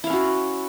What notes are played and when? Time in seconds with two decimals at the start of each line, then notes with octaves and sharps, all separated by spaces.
0.04 E4
0.07 F5
0.10 C#4
0.13 F#4